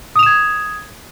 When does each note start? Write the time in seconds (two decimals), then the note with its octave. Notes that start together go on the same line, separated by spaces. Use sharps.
0.16 D#6
0.19 F7
0.23 E7
0.26 G#6